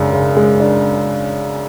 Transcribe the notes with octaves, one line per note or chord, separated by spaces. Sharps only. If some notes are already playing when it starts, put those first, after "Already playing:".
Already playing: F#2 C#3 G#3 D4
C#3
G#3
D4